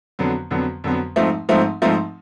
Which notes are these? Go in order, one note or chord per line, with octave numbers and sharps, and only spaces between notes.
F2 D3 F#3 B3
F2 D3 F#3 B3
F2 D3 F#3 B3
G#2 F3 A3 C4 D#4
G#2 F3 A3 C4 D#4
G#2 F3 A3 C4 D#4